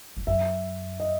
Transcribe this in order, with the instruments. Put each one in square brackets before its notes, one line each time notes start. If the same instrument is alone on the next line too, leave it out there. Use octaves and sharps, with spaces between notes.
[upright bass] G#2
[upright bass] F#2 [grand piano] E5
[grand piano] D#5